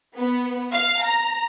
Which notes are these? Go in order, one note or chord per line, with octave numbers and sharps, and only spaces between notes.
B3
F5
A#5